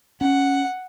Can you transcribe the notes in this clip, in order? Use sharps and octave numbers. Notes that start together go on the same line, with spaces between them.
C#4 F#5